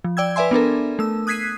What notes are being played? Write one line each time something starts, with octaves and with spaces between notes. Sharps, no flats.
F3
D5 G5 E6 G#6
B4 D5 E5 G#5 C6
B3 D4 A4 A#4
A3 E6
D#6 F#6 G#6 B6 C7 D#7